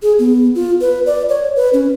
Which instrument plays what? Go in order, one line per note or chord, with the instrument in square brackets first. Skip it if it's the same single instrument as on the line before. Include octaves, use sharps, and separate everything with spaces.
[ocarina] G#4
B3
F4
B4
D5
C#5
B4
C#4